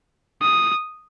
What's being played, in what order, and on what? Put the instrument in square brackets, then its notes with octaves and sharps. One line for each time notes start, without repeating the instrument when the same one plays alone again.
[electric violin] D#6